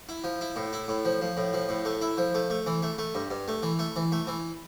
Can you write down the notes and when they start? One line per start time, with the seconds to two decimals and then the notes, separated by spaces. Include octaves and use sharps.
0.09 E4
0.24 F3
0.41 E4
0.56 A2
0.73 E4
0.88 A2
1.05 F3
1.21 F3
1.37 A2
1.53 F3
1.69 A2
1.85 A3
2.01 E4
2.18 F3
2.34 A3
2.50 A3
2.66 E3
2.83 A3
2.98 A3
3.15 G2
3.30 G2
3.48 A3
3.63 E3
3.79 A3
3.96 E3
4.12 A3
4.27 E3